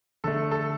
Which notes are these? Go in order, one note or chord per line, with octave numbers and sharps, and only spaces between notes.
D3 A3 A4
A4